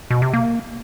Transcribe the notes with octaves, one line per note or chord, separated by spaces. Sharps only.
B2
C3
A#3